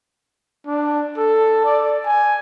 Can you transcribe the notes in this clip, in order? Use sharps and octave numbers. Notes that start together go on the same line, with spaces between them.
D4
A4
D5
G#5